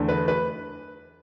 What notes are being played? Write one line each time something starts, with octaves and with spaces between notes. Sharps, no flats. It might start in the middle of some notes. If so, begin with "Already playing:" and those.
Already playing: E2 D3 A3
B4
B4